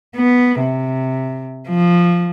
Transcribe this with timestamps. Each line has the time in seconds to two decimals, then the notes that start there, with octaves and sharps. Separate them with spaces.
0.17 B3
0.60 C3
1.69 F3